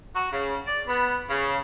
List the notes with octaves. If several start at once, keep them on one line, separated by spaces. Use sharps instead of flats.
F#4
C#3
D5
B3
C#3